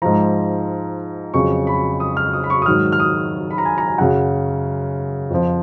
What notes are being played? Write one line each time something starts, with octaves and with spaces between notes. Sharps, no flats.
G#2 F3 A#5
F2 C#3 F#3 C#6
B5
D#6
F6
D#6
B5
C#6
D#6
G#2 D#3 F#3 F6
F6
D#6
B5
A#5
G#5
A#5
G#5
F#2 C#3 F#3 F#5
F2 F3